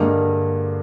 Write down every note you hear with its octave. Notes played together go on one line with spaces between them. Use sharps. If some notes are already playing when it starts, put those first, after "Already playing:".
Already playing: G2 D3 G#3 A#3